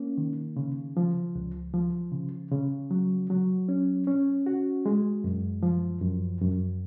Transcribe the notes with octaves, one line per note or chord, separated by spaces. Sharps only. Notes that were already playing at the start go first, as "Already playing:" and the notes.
Already playing: A#3 C#4
D#3
C#3
F3
C#2
F3
C#3
C#3
F#3
F#3
C#4
C#4
F#4
G#3
F#2
F3
F#2
F#2